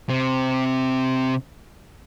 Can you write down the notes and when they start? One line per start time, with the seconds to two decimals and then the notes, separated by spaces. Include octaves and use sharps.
0.09 C3 C4